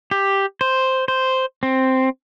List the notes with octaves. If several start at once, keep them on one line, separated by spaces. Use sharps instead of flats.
G4
C5
C5
C4